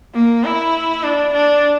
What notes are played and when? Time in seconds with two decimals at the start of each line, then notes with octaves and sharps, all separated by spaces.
0.15 A#3
0.44 E4
1.03 D4
1.33 D4